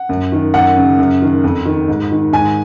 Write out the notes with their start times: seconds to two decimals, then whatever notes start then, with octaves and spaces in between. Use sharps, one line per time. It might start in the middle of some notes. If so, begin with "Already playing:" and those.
Already playing: F#5
0.09 F#2
0.32 D#3
0.54 F#2 F#5
0.77 C#3
0.98 F#2
1.22 D#3
1.44 F2
1.65 D#3
1.88 G#2
2.11 D#3
2.33 G#2 G#5